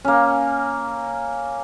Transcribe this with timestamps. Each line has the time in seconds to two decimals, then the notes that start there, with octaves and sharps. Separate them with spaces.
0.05 A#3 C#4